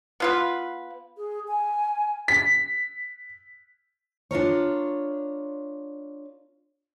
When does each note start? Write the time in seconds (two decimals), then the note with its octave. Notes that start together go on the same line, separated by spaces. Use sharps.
0.20 B3 F4 B4
1.17 G#4
1.48 G#5
2.28 B6
4.31 D4 F4 A#4 C#5